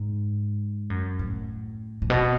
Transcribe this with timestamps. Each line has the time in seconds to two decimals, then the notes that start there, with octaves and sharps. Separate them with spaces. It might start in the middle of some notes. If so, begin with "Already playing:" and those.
Already playing: G#2
0.90 F#2
1.19 A2
2.02 A2
2.10 B2